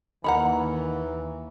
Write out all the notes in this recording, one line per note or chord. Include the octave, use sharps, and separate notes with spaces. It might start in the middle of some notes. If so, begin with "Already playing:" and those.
D#2 E3 D#4 A#4 F#5 A#5 B5